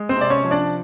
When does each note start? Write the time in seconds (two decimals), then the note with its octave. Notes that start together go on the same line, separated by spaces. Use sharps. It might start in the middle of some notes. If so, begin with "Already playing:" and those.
Already playing: G#3
0.09 C4 C5
0.16 C3
0.21 D5
0.30 C#4 C#5
0.45 F3
0.51 D4 D5